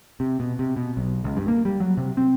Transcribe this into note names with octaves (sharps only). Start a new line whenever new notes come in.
C3
B2
C3
B2
B1
C#2
G2
A#3
G3
F#3
C3
C4